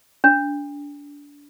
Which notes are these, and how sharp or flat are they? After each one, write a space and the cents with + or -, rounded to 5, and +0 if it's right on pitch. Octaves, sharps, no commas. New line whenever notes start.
D4 -25